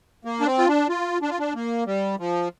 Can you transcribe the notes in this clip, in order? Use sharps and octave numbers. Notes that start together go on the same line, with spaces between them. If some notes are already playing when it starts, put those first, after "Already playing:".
A#3
D4
C4
F4
D4
F4
D4
F4
D4
A#3
G3
F3